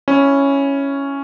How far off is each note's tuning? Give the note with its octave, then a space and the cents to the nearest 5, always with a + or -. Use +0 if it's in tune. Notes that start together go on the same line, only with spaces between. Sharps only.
C#4 +0 E4 +0